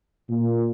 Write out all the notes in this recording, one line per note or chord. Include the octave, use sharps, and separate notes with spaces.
A#2